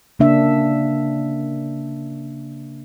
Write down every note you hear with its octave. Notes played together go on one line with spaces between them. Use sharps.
C#3 A#3 D4 E5